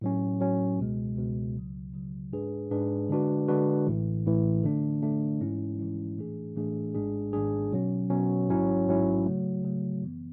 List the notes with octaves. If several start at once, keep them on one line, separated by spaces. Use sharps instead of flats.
A2 F#3 C#4
A2 F#3 C#4
C#2 B2 G#3
C#2 B2 G#3
C#2 C#3 F#3
C#2 C#3 F#3
G#2 G#3 D4 G#4 B4
G#2 G#3 D4 G#4 B4
D3 G#3 D4 F#4 B4
D3 G#3 D4 F#4 B4
A1 A2 E3
A1 A2 E3
D3 A3 D4
D3 A3 D4
G#2 E3 G#3 C#4 E4
G#2 E3 G#3 C#4 E4
A2 E3 A3 D4 G#4
A2 E3 A3 D4 G#4
G#1 G#2 G#3 D4 G#4
G#1 G#2 G#3 D4 G#4
B2 F#3 C#4
B2 F#3 C#4
A1 G#2 F#3 C#4 E4
A1 G#2 F#3 C#4 E4
C#3 F#3 A3
C#3 F#3 A3
F#2 E3 B3